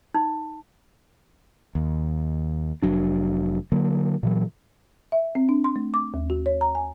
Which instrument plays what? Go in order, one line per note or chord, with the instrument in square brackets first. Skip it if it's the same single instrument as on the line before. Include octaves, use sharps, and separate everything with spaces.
[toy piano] D#4
[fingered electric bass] D#2
F1 F#3 D4
D3 F#3 A#3
A#2 E3 F#3
[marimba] E5
C4
D4
C6
A3
D6
D#2
F#4
C#5
A#5
G#5